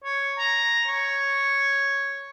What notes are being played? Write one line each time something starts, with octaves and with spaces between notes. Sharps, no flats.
C#5
A#5
C#5